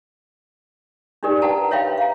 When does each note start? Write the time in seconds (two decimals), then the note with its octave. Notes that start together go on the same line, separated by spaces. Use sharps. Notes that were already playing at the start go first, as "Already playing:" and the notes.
1.23 D4 D#4 G4 A#4 D5
1.42 B4 F#5 G5 A5 A#5
1.71 B4 C#5 E5 F5 G5 B5
1.98 F5 A#5